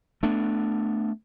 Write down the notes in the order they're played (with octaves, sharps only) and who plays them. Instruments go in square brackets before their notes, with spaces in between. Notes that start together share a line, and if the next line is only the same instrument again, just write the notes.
[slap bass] A3 B3 D4